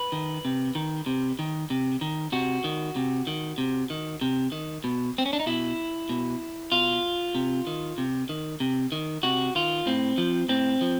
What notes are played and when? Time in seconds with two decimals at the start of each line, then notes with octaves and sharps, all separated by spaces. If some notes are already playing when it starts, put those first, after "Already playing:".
Already playing: B4
0.12 D#3
0.45 C3
0.75 D#3
1.06 C3
1.39 D#3
1.70 C3
2.01 D#3
2.32 C3 F#4
2.64 D#3
2.96 C3
3.27 D#3
3.58 C3
3.90 D#3
4.21 C3
4.52 D#3
4.84 B2
5.18 C4
5.26 C#4
5.33 D4
5.40 D#4
5.46 B2 E4
6.09 B2
6.72 B2 F4
7.35 C3
7.67 D#3
7.98 C3
8.29 D#3
8.60 C3
8.92 D#3
9.23 C3 F#4
9.55 D#3 F4
9.86 A2 C4
10.18 F3
10.49 A2 C4
10.81 F3